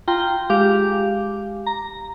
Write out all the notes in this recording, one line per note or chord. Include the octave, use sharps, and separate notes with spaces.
F4 G5 A#5 C6
G#3 G4 F5 D6
A#5